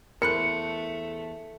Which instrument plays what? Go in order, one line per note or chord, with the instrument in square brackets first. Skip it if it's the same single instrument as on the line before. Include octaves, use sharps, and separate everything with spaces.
[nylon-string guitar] E2 C5 [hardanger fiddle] A3 [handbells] A#4 B5 F#6 [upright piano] C#7